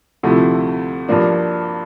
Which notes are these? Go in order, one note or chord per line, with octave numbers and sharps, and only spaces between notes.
D2 C3 F3 A3 E4
G2 F3 A#3 D4